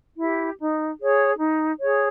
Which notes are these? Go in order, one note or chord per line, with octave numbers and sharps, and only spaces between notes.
E4 G4
D#4
G#4 C#5
D#4
G#4 C#5